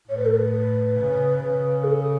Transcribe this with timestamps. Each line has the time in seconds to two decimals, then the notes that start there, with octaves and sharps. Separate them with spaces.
0.09 A2 C#5
0.17 B4
0.25 A4
0.34 B4
1.00 C#3
1.46 C#3
1.83 G#4
1.91 A4